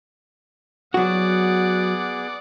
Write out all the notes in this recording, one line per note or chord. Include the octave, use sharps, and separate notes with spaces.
F#3 B3 F#4 G#4 D5 F#5